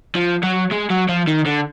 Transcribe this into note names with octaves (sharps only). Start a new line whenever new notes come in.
F3
F#3
G#3
F#3
F3
D#3
D3